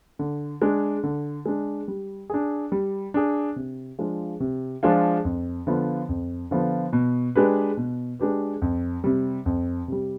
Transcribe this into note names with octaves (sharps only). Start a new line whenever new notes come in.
D3
G#3 D4
D3
G#3 D4
G3
D4 G#4
G3
D4 G#4
C3
F3 G#3 D4 F4
C3
F3 G#3 D4 F4
F2
D3 F3 B3 F4
F2
D3 F3 B3 F4
B2
G#3 D4 G4 B4
B2
G#3 D4 G4 B4
F2
C3 G3
F2
C3 G3